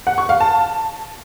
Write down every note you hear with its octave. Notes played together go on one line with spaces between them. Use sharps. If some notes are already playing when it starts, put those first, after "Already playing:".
F#5
C#6
F5
A5